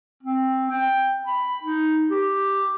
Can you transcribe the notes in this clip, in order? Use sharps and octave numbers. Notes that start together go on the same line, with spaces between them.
C4
G5
B5
D#4
G4